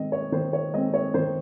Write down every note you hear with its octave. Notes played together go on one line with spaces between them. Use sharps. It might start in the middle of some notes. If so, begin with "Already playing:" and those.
Already playing: D#3 G#3 C4 D#5
C#5
D#3 C5
C#5
G#3 C4 D#5
C#5
D#3 C5